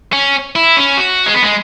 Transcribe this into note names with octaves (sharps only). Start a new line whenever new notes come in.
C#4
E4
C#4
F#4
G#3
B3
G#3